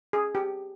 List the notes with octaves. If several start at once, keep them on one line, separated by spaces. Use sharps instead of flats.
G#4
G4